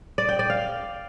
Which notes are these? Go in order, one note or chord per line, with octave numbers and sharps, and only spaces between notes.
D5
G5
D5
F5